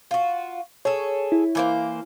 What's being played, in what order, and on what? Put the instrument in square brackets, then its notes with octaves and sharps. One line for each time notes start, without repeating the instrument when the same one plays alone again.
[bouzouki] F4 F#4
[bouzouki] G#4 A4 [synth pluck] C#5
[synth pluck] E4
[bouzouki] E3 A#3 C5